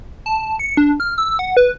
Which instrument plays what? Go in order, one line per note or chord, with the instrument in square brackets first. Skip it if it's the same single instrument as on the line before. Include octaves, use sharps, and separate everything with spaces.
[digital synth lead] A5
C#7
D4
F6
E6
F#5
B4